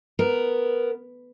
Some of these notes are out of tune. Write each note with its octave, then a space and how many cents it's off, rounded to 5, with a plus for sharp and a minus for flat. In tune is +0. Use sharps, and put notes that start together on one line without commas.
B3 +0 A#4 +0